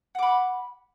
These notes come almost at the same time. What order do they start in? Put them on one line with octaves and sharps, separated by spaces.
F#5 D6 B5